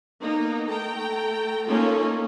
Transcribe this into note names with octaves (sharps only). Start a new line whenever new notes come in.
A#3 B3 D#4
A3 G5 A#5
A3 A#3 C#4 D#4 F4 A4